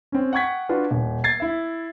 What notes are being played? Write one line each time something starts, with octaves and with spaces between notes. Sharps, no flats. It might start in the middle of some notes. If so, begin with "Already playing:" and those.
C4 C#4
F#5 G5 C#6 G#6 B6
D4 F4 F#4 B4
D#1
G#6 A6 C7
E4 E5